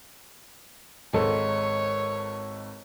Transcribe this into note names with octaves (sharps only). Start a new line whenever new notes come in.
G#1 G#2 A4 C#5